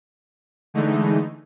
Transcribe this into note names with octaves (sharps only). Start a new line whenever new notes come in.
D3 E3 G#3 A3 D#4